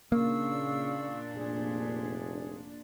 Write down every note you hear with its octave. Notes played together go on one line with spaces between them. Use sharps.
A#2 C#3 A#3 D4 F5 C#6 E6
F1 G#4